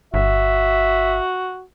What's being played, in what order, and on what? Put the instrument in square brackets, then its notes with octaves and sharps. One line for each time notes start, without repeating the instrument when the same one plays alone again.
[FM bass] G1 [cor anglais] F#4 [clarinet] E5